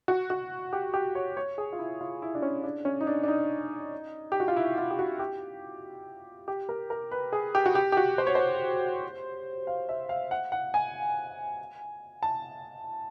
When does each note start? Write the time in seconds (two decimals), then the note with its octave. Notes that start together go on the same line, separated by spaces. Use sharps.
0.08 F#4
0.30 F#4
0.73 G4
0.94 G4
1.15 C#5
1.37 C#5
1.58 G#4
1.73 F4
1.79 E4
2.01 F4
2.22 E4
2.35 D4
2.42 C#4
2.64 D4
2.85 C#4
3.01 D#4
3.07 D4
3.23 D4
3.28 D#4
4.32 G4
4.40 F#4
4.48 F4
4.56 E4
4.78 F4
4.91 G4
4.99 F#4
5.19 G4
6.48 G4
6.69 A#4
6.90 A#4
7.11 B4
7.33 G#4
7.55 G4
7.66 F#4
7.75 G4
7.92 G4
7.97 F#4
8.18 C5
8.27 C#5
8.35 C5
9.67 F5
9.89 E5
10.09 F5
10.31 F#5
10.52 F#5
10.74 G#5
12.23 A5